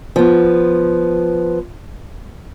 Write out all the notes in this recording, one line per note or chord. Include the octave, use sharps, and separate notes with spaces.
F3 B3